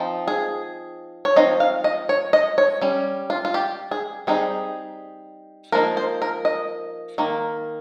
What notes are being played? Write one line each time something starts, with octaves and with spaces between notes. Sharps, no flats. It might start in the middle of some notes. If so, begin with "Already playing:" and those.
Already playing: F3 C4 D#4
G#4
C#5
F3 C4 D#4 D#5
F5
D#5
C#5
D#5
C#5
G3 C#4
F4
F4
G4
G#4
G3 C4 D#4 G#4
F3 A#3 D#4 A#4
C5
A#4
D#5
D#3 A#3